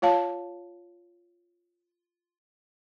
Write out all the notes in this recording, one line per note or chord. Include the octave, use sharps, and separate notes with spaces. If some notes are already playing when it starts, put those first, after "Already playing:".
F4 C#5 F5 A5